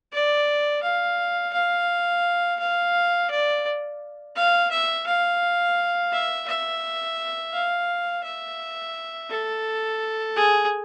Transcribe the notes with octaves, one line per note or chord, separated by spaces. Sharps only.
D5
F5
F5
F5
D5
F5
E5
F5
E5
E5
F5
E5
A4
G#4